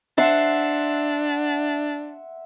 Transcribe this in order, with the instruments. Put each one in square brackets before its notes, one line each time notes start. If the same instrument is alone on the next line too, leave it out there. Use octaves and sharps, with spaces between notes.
[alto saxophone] D4 [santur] E5 F#5 C6